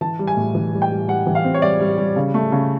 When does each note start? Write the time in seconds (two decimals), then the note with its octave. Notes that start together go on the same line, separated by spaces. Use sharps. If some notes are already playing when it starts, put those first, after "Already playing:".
0.01 E3 A5
0.19 G3
0.27 G#5
0.37 A2
0.55 E3
0.73 G3
0.82 G5
0.91 G3
1.08 G3 F#5
1.27 E3
1.35 F5
1.44 C4
1.54 C#5
1.62 G3 D5
1.80 G3
1.98 G3
2.16 C#3
2.34 A3
2.52 C#3